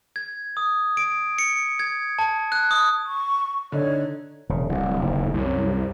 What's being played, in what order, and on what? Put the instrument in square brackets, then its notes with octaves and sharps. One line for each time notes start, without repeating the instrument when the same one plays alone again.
[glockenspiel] G#6
D#6
D7
C#7
G#6
A5
F#6
D#6
[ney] C#6
[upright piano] D3 D#4 [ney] C#5
[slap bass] E1 C#3
[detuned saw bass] D1 [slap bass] C2 C3
[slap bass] F#1 D#2
[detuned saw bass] C2 [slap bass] F#2